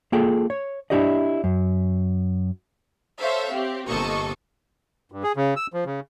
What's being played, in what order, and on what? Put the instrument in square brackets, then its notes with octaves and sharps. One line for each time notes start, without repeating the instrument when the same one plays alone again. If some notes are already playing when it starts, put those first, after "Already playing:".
[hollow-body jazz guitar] A#3 F4 G#4 A4 G5
C#5
D4 E4 G4 D5 D#5
F#2
[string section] A4 C5 C#5 E5 F5
C4 G4
G1 C3 A#3 A4 D#5 C#6
[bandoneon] G2
G#4
C#3
E6
F3
C#3